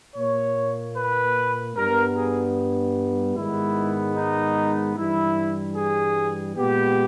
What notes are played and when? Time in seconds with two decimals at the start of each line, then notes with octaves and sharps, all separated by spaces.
0.15 A#2 A#3 C#5
0.96 B4
1.76 G2 G3 B3 A#4
2.16 G#4
3.36 G#2 D#3 G#3 B3 E4
4.16 D#4
4.96 G2 E3 G3 E4
5.76 G#4
6.56 A#2 G#3 B3 G4